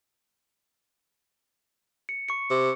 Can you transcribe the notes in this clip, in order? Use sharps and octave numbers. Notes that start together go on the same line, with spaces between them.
C#7
C#6 C#7
C3